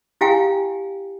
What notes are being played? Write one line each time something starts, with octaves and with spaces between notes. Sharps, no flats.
E4 G4 F5 G5 G#5